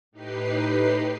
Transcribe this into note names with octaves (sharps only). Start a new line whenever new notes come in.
A2 D#4 G4 B4 C7